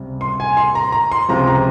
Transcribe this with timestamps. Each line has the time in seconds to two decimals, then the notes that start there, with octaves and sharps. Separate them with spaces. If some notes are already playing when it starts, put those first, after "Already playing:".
Already playing: C#2 C3 G3
0.21 C6
0.40 G#5
0.57 C6
0.75 A#5
0.92 A#5
1.12 C6
1.29 C#2 C3 F3 A#5
1.47 A#5